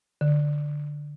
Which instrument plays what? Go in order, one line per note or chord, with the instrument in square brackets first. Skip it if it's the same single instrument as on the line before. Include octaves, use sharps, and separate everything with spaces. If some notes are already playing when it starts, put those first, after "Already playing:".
[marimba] D3